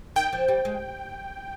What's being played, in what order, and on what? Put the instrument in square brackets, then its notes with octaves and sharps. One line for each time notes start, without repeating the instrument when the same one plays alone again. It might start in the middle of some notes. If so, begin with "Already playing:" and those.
[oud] D#3 [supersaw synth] G5
[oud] F3
G3
G#3